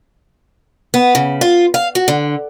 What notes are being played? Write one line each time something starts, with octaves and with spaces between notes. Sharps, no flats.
B3
C#3
F4
F5
F#4
D3